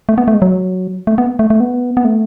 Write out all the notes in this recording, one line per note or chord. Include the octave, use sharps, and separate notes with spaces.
A3
B3
A3
G#3
F#3
A3
B3
A3
A3
B3
B3
A3